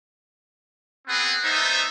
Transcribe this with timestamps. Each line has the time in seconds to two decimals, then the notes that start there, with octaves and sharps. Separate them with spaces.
1.07 B3 C4 G#4 B4 F#5
1.44 A3 B3 D#4 C5 E5